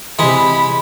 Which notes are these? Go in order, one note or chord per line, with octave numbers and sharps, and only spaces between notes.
C3 E3 G#3 B5